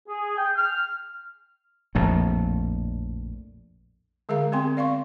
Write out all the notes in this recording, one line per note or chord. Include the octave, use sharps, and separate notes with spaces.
G#4
G5
F6
A#1 F2 A2
D3 G#3 G#4 A#4 F5 A#5
B3 C4 G4 A#4 G5 C6
D5 F5 C6 C#6